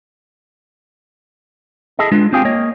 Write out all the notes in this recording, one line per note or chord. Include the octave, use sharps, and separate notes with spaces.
E4 G#4 A4 D#5
G#3 D4 F4 B4
C4 F4 G4 G#4 F5 G5
A#3 C#5 D#5